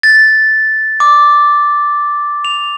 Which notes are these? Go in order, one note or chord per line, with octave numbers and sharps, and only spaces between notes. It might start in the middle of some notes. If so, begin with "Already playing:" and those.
A6
D6
F7